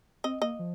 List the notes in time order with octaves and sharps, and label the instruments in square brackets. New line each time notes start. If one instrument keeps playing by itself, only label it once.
[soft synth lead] C4 [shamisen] D#5
[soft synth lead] A#3 [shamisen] D#5
[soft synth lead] F3